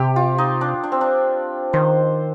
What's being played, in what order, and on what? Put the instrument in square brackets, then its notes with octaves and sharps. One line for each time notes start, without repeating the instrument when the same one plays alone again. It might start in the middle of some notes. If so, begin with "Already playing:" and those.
Already playing: [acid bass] C3 [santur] G4
[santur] F4
D#4
D4
D4
C4
D4
[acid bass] D#3 [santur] C5